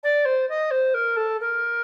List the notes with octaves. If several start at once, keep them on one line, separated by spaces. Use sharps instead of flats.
D5
C5
D#5
C5
A#4
A4
A#4